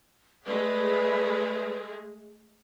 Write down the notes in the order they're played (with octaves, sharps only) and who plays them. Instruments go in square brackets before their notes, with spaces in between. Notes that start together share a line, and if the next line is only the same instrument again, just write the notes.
[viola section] G#3 A3 G#4 [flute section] B4 D5